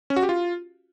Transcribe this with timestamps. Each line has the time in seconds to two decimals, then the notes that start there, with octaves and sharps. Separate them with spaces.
0.10 C#4
0.16 F#4
0.23 G4
0.29 F4